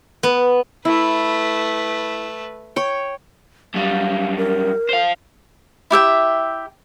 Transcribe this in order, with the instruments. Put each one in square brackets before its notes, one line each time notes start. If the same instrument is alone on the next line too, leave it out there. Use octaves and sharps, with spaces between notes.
[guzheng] B3
[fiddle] A3 B4 [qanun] E4
[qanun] C#5 G5
[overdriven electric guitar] F#2 G3 [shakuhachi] F5
[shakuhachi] A#4
[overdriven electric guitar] C5 F5
[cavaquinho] E4 G4 E5 G5